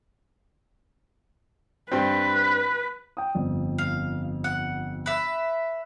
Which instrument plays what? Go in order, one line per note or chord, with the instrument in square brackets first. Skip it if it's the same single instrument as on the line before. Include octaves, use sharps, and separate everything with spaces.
[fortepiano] G2 C4 [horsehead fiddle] B4
[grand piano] G5 D#6
G1 F2
[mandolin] F5
F#5
B4 E5